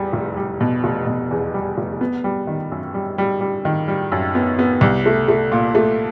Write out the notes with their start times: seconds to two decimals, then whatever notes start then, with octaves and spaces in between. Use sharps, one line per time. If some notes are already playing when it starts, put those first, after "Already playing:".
Already playing: E2 G3
0.13 F1
0.37 G3
0.61 B2
0.84 F1
1.07 B2
1.31 E2
1.54 G3
1.77 F1
2.01 B3
2.24 G3
2.47 D#3
2.72 F#2
2.94 G3
3.18 G3
3.41 G3
3.65 D#3
3.88 G3
4.12 F#2
4.35 B3
4.59 B3
4.81 C2
5.06 A3
5.28 A3
5.52 A#2
5.75 A3